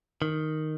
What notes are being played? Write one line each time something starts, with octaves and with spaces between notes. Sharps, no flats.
D#3